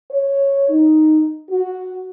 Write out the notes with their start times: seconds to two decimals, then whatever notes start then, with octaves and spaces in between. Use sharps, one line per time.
0.11 C#5
0.69 D#4
1.50 F#4